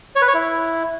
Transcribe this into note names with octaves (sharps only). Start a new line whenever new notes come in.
C#5
B4
C#5
E4